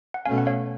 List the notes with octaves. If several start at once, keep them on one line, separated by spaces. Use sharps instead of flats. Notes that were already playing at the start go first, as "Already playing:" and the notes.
F#5
B2 A3 C#4 F5 G#5
F#5
C#5 F5